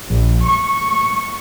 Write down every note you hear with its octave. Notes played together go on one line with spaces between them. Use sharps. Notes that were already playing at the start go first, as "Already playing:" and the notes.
A#1
C#6